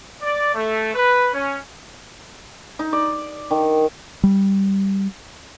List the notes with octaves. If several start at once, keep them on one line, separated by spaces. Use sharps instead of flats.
D5
A3
B4
C#4
D#4
D5
D#3
G3